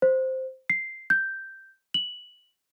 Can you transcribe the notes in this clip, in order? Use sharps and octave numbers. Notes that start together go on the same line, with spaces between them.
C5
C7
G6
F#7